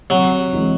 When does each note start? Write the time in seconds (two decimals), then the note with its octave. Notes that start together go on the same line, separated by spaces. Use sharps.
0.10 C3 F#3
0.53 E3 G#3 C4